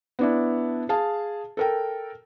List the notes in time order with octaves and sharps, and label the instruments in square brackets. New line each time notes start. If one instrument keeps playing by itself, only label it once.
[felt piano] B3 D4 E4
G#4 F5 A5
A4 A#4 G5